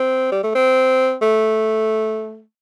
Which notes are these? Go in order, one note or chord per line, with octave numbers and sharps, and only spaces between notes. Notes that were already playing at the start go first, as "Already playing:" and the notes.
Already playing: C4
G3
A3
C4
A3